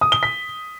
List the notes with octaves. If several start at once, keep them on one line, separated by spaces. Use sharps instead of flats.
D#6
G7
B6